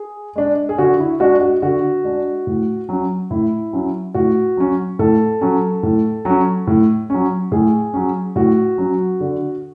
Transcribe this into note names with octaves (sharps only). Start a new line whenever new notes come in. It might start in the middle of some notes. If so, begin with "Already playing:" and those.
Already playing: G#4
G#3 D4
G#4
D3 F#4
E4
G#3 D4 F#4
F#4
D3 F#4
G#3 D4
A2
F#3 C#4
A2 E4
F#3 C#4
A2 F#4
F#3 C#4
A2 A4
F#3 C#4
A2
F#3 C#4
A2
F#3 C#4
A2 G#4
F#3 C#4
A2 F#4
F#3 C#4
D3